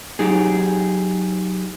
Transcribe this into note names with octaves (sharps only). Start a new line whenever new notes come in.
F#3 D#4 G4 G#4